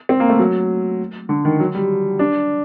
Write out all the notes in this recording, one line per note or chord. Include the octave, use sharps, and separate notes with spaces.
C4
A#3
A3
F#3
D3
D#3
F#3
G3
D4